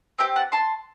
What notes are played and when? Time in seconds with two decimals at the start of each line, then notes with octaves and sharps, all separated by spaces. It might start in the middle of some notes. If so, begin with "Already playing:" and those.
0.18 C4 G4 E5 G5
0.36 F#5 A5
0.52 A5 C6